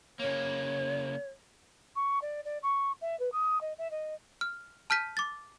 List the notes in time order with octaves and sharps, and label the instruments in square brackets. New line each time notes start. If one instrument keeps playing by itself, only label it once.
[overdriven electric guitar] C#3 A#3 [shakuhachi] C#5
[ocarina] C#6
D5
D5
C#6
E5
B4
D#6
D#5
E5
D#5
[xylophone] F6
A5 F6 G6 B6 D#7
D6 A6